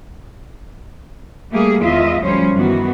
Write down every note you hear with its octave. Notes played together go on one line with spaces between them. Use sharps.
G3 A3 A#3 G4 G#4
E2 D#3 G#3 F4 D#5 E5
D2 F3 G3 C#4 C5 C#5
G2 D#3 E3 B3 F#4